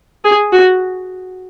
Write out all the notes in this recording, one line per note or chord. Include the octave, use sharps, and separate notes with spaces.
G#4
F#4